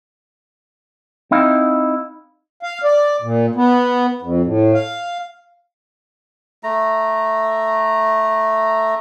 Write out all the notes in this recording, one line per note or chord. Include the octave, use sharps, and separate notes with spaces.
C4 D#4 E4 F5
F5
D5
A#2
B3
F2
A2
F5
A3 A#5